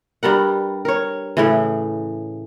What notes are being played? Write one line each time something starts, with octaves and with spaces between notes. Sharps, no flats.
G2 G3 A#4 F#5
A#4 C#5
A2 C#3 E3